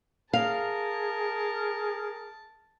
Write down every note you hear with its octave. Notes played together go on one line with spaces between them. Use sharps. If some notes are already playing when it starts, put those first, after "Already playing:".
G#4 A#4 F5 A5